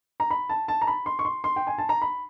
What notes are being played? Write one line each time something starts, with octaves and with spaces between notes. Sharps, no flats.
A#5
B5
A5
A5
A#5
B5
C6
C#6
C6
C6
G5
G#5
A5
A#5
B5